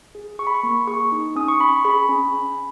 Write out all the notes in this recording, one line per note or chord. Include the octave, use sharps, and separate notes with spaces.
G#4
G#4 C#6
B5
C#6
A#3
G#4 C#6
D#4
C#4 D#6
C#6
C#4 B5
C#6
G#4 B5
C#4
C#4